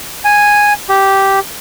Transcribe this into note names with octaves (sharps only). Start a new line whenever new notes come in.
G#5
G4